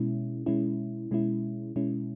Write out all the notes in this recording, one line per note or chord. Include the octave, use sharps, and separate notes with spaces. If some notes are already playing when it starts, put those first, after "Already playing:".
Already playing: B2 G#3 C#4 E4
B2 G#3 C#4 E4
B2 G#3 C#4 E4
B2 G#3 C#4 E4